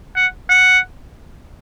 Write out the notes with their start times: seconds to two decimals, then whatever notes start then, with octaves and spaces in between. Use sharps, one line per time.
0.16 F#5
0.49 F#5